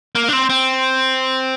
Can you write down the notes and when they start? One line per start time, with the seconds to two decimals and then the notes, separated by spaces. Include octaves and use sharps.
0.15 A#3
0.28 D4
0.33 C4
0.50 C4